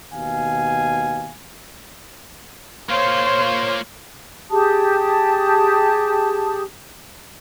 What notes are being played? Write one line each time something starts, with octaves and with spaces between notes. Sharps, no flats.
D#2 B2 F5 G#5
A#3 F4 C5 C#5 F5 C6
G4 G#4 A5 D#6